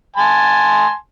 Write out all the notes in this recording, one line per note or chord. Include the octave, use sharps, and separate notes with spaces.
G#5 A5 C6